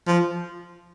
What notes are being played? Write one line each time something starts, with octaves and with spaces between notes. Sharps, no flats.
F3